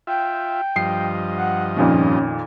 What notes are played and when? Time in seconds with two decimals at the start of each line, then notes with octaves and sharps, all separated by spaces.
0.07 F4 E5 G5
0.76 G2 F3 D#5 C7
1.37 F#5
1.77 F2 A#2 D#3 C#4